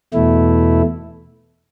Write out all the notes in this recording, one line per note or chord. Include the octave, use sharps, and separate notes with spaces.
E2 B2 A3 E4